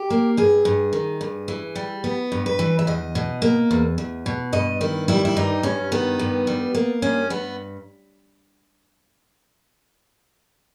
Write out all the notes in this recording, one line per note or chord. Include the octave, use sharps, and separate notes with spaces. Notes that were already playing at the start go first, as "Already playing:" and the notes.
Already playing: G4
A#3
G2 G#4
G2
D#3
G2
E3
G3
B3
G2
B4
E3
E5
E2 D#5
B2
A#3
E2
E2
B2
G2 D#5
D#3 E4
G3 E4
E4
G2 D#4
G2 C#4
D#3 B3
G2
G3
A#3
G2 C#4
G2 B3